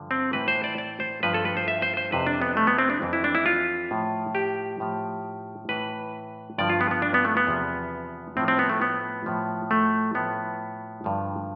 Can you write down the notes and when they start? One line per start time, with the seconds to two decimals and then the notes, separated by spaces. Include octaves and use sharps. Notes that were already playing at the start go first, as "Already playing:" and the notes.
Already playing: G2 D3 F3
0.11 C4
0.33 A2 E3 B4
0.48 C5
0.64 D5
0.78 D5
1.00 C5
1.23 G2 F3 B4
1.34 A4
1.45 B4
1.57 C5
1.68 E5
1.82 C5
1.97 C5
2.12 F2 C3 E3 B4
2.27 D4
2.42 B3
2.57 A3
2.67 B3
2.79 C4
2.90 D4
3.02 F2 E3
3.13 E4
3.24 D4
3.35 E4
3.46 F4
3.91 A2 F3
4.35 G4
4.80 A2 F3
5.69 A2 E3 B4
6.58 G2 D3 F3 D5
6.70 F4
6.81 B3
6.91 B3
7.02 D4
7.14 B3
7.25 A3
7.37 B3
7.47 E2 C3 F3
8.37 A2 F3 C4
8.48 C4
8.59 B3
8.69 A3
8.81 B3
9.26 A2 F3
9.71 A3
10.15 A2 F3 B3
11.04 G2 D3 F3